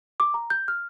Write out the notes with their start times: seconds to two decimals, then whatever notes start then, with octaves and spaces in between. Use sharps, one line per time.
0.20 D6
0.34 A#5
0.50 G6
0.68 F6